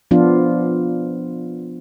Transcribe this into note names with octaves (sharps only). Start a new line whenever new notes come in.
F3 B3 D4 F4